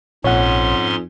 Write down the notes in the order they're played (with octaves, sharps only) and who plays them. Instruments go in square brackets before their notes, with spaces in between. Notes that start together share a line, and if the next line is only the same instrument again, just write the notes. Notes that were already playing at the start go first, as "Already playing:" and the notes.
[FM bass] A#1 [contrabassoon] F2 [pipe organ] G#2 C#4 C6 [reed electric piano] C#5 F#5